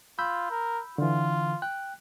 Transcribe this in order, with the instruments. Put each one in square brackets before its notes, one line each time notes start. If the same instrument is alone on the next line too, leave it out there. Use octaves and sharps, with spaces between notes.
[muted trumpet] F4 [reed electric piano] B5 E6 G6
[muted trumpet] A#4
[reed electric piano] D3 E3 [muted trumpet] F4
[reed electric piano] G5 F#6